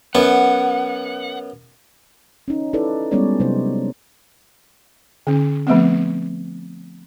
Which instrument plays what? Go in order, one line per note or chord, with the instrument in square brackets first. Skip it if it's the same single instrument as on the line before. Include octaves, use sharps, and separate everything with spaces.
[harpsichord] F#2 B3 [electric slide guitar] F#5
[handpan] C#4 D#4
D#4 E4 A4 B4 D5
G3 G#3 B3 C#4 C#5 D5
C3 F#3 D#4 G4 C5
[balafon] D3 C#4
F3 A3 B3 C4